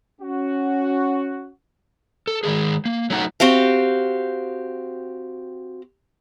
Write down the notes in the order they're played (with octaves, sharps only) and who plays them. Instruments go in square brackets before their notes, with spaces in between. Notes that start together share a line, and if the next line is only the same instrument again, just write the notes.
[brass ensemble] C#4 F#4
[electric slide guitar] A4
D#3 F3 G#3 G#4
A#3
F#3 A3 D#4 F#5
[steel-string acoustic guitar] C4 F#4 G4 F5